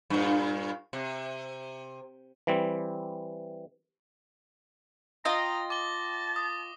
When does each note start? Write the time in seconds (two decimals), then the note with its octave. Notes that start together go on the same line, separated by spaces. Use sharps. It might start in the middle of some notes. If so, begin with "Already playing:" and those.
0.10 G2 A#2
0.93 C3
2.47 E3 G3 C4
5.25 F4 D#5 G5 A#5 A#6
5.70 A5 D6 G7
6.36 D#6